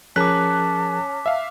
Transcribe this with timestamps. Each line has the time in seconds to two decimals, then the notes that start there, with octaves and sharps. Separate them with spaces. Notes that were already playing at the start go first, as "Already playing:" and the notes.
0.16 F3 C#4 G#4 A#4 A5 D6 F#6 B6
1.26 E5 F5